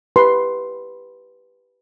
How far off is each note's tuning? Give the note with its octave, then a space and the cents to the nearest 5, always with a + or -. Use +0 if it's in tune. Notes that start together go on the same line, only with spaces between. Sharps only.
G4 +0 B4 +0 C6 +0